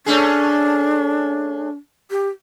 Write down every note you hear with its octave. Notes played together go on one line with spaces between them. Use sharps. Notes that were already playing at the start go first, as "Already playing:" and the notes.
A3 C#4 D4 G#4
G4